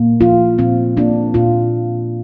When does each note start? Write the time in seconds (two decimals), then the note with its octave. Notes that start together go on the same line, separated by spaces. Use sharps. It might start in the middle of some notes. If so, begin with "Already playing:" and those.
Already playing: A#2 A#3
0.21 F3 F4
0.58 A#2 C4
0.97 A#3 D4
1.34 A#2 F4